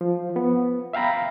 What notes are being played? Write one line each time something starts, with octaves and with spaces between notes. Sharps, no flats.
F3
B3
E5 F5 G5 A#5 B5